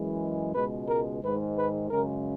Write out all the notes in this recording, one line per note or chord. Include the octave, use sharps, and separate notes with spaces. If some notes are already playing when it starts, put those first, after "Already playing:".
Already playing: F#2 E3 G#3
C#2 B2 G#3 B4
A#4
G#2 D#3 G#3 B4
B4
F#2 C#3 G#3 A#4